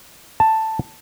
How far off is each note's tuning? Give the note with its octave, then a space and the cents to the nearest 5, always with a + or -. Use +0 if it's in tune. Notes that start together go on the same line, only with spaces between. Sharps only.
A5 +5